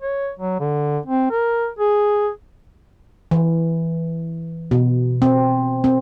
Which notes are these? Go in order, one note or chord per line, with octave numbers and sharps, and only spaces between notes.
C#5
F#3
D3
C4
A#4
G#4
E3
B2
C4
C4